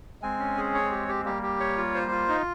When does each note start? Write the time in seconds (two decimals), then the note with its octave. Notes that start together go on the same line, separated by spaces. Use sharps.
0.22 G#3 C4 G#5
0.39 C#4
0.57 G#4
0.74 C#5
0.91 G4
1.08 G4
1.25 G3 A#3 G4
1.43 G4
1.60 C#5
1.77 F4
1.95 C5
2.11 F4
2.29 D#4